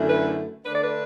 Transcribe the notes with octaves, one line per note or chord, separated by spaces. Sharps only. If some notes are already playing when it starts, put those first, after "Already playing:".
Already playing: F#2 D3 A3 E4
B4
D3 A3 D4 B4
D5
B4